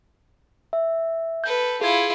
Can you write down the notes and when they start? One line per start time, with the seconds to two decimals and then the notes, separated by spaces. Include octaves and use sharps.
0.73 E5
1.44 A4 B4 G6
1.81 E4 F4 G#4 G#6